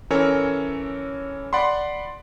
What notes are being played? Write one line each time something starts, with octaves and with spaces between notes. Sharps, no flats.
E3 C#4 A4 A#4 C#5
D5 F#5 B5 C6